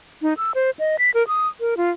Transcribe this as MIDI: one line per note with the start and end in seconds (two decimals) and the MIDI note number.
0.22 0.34 63
0.37 0.52 88
0.55 0.70 72
0.79 0.96 75
0.99 1.10 95
1.14 1.26 70
1.28 1.48 87
1.60 1.74 70
1.77 1.90 65